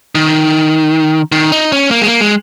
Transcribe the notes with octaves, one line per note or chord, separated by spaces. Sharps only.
D#3
D#3
D#4
C#4
A#3
G#3
A#3
G#3